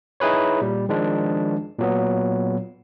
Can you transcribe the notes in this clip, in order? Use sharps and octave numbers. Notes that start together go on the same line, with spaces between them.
D#4 E4 G#4 B4 C#5
A#2 G3
D#3 F3 G#3 D4
A#2 F#3 B3